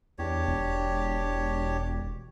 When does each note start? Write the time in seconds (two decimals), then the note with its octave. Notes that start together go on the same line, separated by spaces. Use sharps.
0.19 E2 D4 G4 C#5
0.47 E1